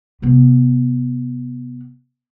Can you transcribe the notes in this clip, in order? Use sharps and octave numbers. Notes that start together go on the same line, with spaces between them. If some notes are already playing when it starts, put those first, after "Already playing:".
C3 B3